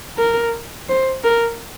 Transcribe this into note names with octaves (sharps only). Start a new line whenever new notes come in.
A#4
C5
A#4